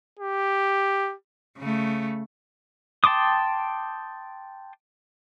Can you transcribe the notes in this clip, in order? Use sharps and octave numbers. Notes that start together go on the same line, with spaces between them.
G4
C#3 A3
G5 A5 C6 D6 D#6